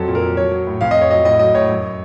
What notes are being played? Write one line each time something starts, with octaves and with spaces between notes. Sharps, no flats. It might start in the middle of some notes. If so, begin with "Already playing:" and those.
Already playing: F2 F#3 A4
A#2
A#4
F#3
F#3 C#5
F#3
A2
F2 F5
D#5
F2
C#5
F#3 D#5
A2 D#5
F#3 D#5
A2 C#5
F#2